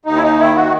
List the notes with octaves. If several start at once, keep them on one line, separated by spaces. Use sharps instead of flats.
D#2 D#4
E4
D#4
D#3 E4
F#4